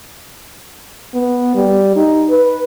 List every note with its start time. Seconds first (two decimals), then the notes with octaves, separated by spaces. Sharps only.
1.14 B3
1.55 G3
1.96 D#4
2.30 B4